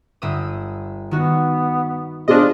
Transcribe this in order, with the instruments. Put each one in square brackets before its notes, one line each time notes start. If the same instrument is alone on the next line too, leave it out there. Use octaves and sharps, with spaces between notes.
[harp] G1 E5 D#6
[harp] D#3 F#4 [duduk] B3
[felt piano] B3 G#4 C5 [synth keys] D4 D#5 [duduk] F4